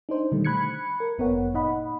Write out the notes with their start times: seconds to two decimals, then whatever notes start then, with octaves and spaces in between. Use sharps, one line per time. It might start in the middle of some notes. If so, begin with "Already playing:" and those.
0.09 D4 D#4 C5
0.31 B2 D3 D#3 G3 A3
0.44 B5 F#6 G#6 C#7
1.00 A#4
1.18 G1 F#2 B3 A#4 C#5 F#5
1.54 A#2 D#4 D#5 F#5 B5